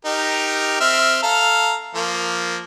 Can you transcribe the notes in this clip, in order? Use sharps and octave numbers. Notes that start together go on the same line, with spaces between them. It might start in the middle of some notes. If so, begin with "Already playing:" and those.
D#4 G4 A#4
C4 E5 F6
A4 F5 A#5
F3 A#3